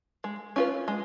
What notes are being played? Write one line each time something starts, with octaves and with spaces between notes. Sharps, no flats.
G#3
C#4 F4 B4
G#3